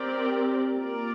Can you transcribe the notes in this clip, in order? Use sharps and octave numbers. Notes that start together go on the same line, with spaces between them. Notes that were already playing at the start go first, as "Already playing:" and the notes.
Already playing: C4 G4 A#4 D5
A#3 F4 A#4 D5